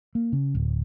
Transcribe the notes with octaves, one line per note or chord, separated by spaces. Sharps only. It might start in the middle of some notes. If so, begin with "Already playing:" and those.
A#3
C#3
D1